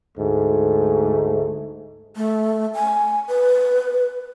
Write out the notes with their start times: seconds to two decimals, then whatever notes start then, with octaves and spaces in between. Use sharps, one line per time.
0.18 D2 G#2 A3
2.17 A3
2.74 G#5
3.28 B4